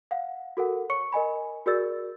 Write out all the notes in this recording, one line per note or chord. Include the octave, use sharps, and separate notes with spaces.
F5 F#5
F#4 A4 A#4 F#5
C#5 C#6 C#7
A#4 D#5 G#5 B5
F#4 G#4 A#4 D5 E6 A6